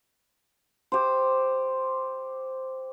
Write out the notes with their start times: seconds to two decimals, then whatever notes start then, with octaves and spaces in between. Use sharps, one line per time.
0.92 G4 C5